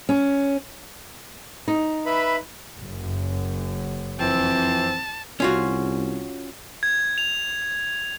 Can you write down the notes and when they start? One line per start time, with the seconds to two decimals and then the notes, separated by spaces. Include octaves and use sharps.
0.09 C#4
1.68 D#4
2.06 B4 E5 B5
2.80 F#1 F#2
4.20 F2 E3 C4 A5
5.40 C2 C#4 F4 F#4
6.83 G#6
7.18 F7